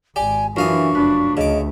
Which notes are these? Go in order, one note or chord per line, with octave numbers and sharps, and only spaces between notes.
G#1 G4 D5 G#5
F#2 E3 D4 F4 A#4 F5 C#6 D#6
F1 D4 B4
D2 C#3 A3 D#5 D6